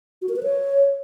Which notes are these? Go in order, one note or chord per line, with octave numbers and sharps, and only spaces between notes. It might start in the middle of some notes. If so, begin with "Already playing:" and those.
F#4
A#4
B4
C#5